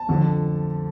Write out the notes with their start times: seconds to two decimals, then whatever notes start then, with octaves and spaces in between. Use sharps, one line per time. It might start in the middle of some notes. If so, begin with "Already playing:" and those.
Already playing: A5
0.09 F2 D3 F3